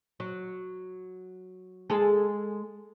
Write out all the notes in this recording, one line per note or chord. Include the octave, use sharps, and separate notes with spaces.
F#3
G#3 G#4 A4